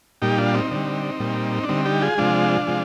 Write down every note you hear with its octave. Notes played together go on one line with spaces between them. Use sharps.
A#2 G3 D#4 G4
D4 F4
C4 D#4
D3 G3
A#2 G3
D4
D3 G3 C4 D#4
D#4 G4
F4 G#4
C3 F3 G#3 D4 F4
C3 F3 G#3